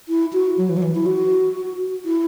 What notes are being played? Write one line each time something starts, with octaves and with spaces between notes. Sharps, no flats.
E4
F#4
F#3
E3
F#3
E3
E4
F#4
E4